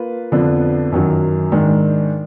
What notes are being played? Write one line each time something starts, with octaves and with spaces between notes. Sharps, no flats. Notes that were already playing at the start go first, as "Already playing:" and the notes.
Already playing: A#3 F4 B4
F2 D3 F3 B3 D4
F#2 D#3 F#3
G#2 D#3 G#3 D4